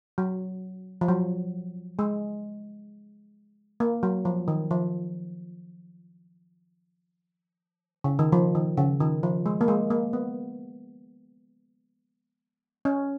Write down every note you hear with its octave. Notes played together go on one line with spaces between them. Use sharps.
F#3
F3
F#3
G#3
A#3
F#3
F3
D#3
F3
C#3
D#3
F3
D#3
C#3
D#3
F3
G#3
A#3
G#3
A#3
B3
C#4